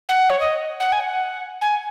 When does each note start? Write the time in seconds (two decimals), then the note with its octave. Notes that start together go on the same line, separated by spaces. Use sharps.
0.09 F#5
0.30 C#5
0.40 D#5
0.80 F#5
0.92 G#5
1.00 F#5
1.61 G#5